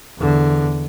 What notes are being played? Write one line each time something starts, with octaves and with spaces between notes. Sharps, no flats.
E2 D3